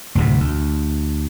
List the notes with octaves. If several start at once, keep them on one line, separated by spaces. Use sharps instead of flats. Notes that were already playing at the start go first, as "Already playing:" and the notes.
D2 A2 C3
D2